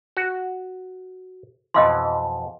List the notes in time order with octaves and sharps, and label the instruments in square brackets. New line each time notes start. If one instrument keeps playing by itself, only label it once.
[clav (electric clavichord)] F#4
[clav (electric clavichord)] F2 B2 E3 [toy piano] D#5 F5 C6